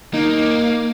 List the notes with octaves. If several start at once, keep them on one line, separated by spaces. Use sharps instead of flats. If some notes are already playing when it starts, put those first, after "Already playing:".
A#3 D#4